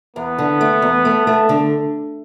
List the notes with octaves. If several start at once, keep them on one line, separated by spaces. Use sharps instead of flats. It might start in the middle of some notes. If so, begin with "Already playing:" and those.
E2 B3
D3
A3
E2
A3
A3
D3